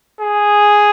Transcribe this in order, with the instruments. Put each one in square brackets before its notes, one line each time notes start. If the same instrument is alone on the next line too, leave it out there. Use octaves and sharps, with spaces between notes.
[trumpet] G#4